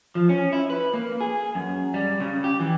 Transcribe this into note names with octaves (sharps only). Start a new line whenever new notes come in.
F3
C#4
E4
B4
A#3
G#4
F#2
G3
C#3
G4
E3